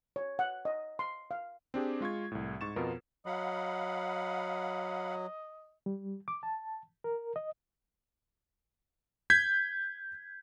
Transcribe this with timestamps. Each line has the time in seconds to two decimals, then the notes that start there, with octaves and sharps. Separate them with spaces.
0.16 C#5
0.39 F#5
0.65 D#5
0.99 C6
1.31 F5
1.74 C4 D4 G4 G#4
2.01 G#3 F4 C#6 G#6
2.32 C2 A2
2.61 G#2 C#6 A6 E7
2.76 F2 B2 B3 F4 A#4
3.26 F#3 D#5 F5 F#5 B5
5.86 G3
6.28 D6
6.43 A5
7.04 A#4
7.36 D#5
9.30 G6 G#6 B6